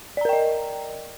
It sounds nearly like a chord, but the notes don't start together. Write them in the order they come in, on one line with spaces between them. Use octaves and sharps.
D5 A#5 A#4 G5 D#5